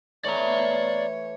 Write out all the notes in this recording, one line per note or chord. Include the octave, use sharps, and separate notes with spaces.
E3 A3 C#5 D5 A#5